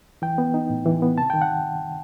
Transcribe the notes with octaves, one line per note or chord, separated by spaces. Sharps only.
E3 G5
B3
D#4
A2
E3
B3
C3 A5
D#3 G5
F#5